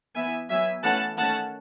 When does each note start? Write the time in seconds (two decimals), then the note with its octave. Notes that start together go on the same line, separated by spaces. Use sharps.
0.15 E3 B3 E5 G#5
0.50 F#3 B3 E5 G#5
0.83 E3 A3 C#4 F#5 A5
1.17 D#3 A3 C#4 F#5 A5